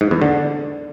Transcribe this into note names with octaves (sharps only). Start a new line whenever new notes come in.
G#2
E2
D3